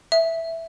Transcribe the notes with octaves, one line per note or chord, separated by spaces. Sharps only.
E5